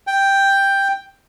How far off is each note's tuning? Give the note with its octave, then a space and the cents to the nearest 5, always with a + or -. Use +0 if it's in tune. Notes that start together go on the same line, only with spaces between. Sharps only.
G5 +5